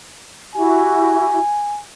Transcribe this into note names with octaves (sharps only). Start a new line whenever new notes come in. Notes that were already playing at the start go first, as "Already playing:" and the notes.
E4 F#4 G4 G#5